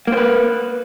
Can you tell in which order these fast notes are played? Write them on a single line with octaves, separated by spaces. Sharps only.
A#3 C5 B4